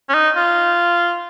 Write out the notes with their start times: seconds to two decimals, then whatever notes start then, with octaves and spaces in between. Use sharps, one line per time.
0.09 C#4
0.14 D#4
0.36 F4